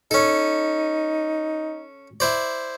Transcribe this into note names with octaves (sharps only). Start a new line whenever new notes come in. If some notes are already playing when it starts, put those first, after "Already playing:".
C#4 D#4 A4
E4 C5 D5